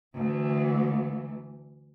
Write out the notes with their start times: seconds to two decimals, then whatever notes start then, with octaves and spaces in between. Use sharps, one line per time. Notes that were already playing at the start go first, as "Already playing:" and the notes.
0.15 D2 E3